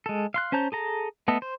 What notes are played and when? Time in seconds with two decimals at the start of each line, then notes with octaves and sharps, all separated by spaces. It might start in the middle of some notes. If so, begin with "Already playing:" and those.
0.06 G#3 A4
0.34 F5 C6 F#6
0.52 C#4 C5 A5 A#5 G6
0.72 G#4 A4 A#5
1.28 A3 B3 A4 D#5
1.42 C5